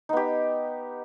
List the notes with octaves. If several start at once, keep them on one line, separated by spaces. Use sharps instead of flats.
B3 D#4 G4